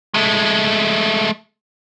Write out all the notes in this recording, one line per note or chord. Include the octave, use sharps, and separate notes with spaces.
G#3 A3